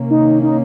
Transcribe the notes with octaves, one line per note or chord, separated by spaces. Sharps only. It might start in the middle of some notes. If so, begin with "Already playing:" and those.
Already playing: C3 D#3 A#3 C#4
D#4
D#4